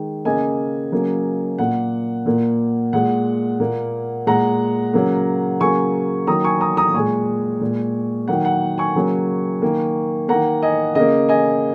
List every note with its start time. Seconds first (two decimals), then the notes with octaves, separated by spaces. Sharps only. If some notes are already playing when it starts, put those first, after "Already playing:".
Already playing: D#3 G#3
0.25 C#3 A#3 D#5 G#5
0.92 C#3 F#3 A#3
1.58 A#2 A#3 F#5
2.26 A#2 A#3
2.93 A#2 G#3 F#5
3.60 A#2 A#3
4.27 A#2 G#3 F#5 A#5
4.93 C#3 F#3 A#3
5.60 C#3 F#3 A#3 G#5 C#6
6.27 D#3 F#3 A#3 A#5 D#6
6.44 G#5 C#6
6.60 A#5 D#6
6.77 A#5 D#6
6.94 A#2 G#3 G#5 C#6
7.61 A#2 G#3
8.28 D#3 F#3 A#3 F#5
8.45 F#5
8.78 G#5 C#6
8.95 C#3 F#3 A#3
9.62 D#3 A#3
10.28 D#3 A#3 F#5 A#5
10.62 D#5 G#5
10.95 C#3 A#3 D#5
11.29 D#5 G#5